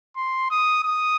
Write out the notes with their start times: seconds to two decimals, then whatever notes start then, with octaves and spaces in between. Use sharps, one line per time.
0.16 C6
0.51 D#6
0.84 D#6